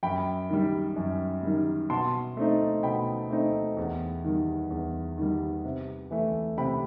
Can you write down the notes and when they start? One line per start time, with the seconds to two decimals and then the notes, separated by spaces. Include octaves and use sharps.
0.03 F#2 G5 B5
0.50 D#3 G3
0.96 F#2
1.43 D#3 G3
1.90 B2 A5 C6
2.37 A3 C4 D#4
2.83 B2 G5 B5
3.30 A3 C4 D#4
3.77 E2
4.24 D#3 G3
4.70 E2
5.18 D#3 G3
5.65 C3
6.11 E3 A3
6.58 C3 G5 B5